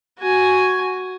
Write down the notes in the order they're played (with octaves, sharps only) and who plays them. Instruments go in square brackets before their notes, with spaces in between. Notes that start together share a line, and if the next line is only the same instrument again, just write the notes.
[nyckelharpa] F#4 G#5